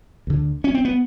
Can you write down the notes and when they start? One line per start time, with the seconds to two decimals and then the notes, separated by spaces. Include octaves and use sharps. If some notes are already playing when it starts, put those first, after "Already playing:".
0.27 D2 D3
0.64 C#4
0.74 C4
0.85 B3